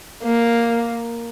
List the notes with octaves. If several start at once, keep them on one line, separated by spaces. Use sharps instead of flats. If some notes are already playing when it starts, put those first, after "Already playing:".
A#3